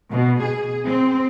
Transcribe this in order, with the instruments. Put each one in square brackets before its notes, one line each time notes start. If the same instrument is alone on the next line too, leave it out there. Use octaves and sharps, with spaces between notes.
[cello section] B2
G#4
C4